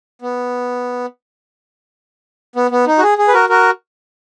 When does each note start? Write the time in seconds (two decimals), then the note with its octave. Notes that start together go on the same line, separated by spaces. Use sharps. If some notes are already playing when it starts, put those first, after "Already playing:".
0.22 B3
2.56 B3
2.71 B3
2.87 D#4
2.98 F#4
3.02 G#4
3.18 G#4
3.28 B4
3.34 F#4 A#4
3.49 F#4 A#4